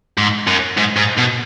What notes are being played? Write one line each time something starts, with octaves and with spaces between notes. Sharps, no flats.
G#2
F#2
G#2
G#2
B2